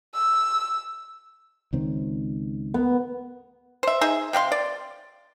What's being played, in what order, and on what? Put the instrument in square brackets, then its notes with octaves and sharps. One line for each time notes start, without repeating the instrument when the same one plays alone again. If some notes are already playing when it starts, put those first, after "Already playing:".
[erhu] E6
[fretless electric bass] C#2 D#3 C4
[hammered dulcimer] B3
[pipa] C5 E5
D#4 G#4 E5
C3 G4 F5 C6
D5